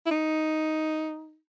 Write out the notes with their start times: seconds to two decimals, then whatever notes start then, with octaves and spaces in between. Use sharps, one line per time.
0.06 E4
0.11 D#4